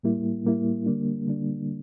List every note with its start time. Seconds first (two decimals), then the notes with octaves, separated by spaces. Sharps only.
0.03 A2 G3 A#3 E4
0.45 A2 G3 A#3 E4
0.86 D3 G3 A#3 D4
1.27 D3 G3 A#3 D4